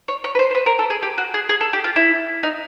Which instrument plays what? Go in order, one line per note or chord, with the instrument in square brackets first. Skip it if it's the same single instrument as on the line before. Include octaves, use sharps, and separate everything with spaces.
[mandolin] C#5
C#5
B4
C5
C5
B4
A#4
A4
G#4
G4
F#4
G#4
G#4
A4
G4
F4
E4
D#4